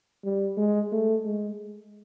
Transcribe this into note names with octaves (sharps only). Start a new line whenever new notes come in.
G3
G#3
A3
G#3